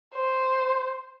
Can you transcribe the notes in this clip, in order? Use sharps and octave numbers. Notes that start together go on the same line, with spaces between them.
C5